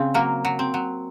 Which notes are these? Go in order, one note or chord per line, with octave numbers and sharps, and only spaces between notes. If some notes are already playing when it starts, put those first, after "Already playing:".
Already playing: C#3 C4
F#3 A#3
F#3
C4
F#3